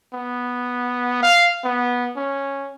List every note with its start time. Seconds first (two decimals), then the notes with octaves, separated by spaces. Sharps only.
0.14 B3
1.23 F5
1.65 B3
2.17 C#4